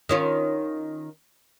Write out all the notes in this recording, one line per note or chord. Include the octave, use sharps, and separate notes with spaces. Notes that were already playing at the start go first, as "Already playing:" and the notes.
D#3 C#4 F4